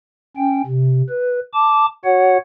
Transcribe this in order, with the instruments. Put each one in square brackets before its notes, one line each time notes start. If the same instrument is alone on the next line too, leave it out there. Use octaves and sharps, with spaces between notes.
[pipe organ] C#4 G5
C3
B4
A5 D6
F#4 C#5 F#5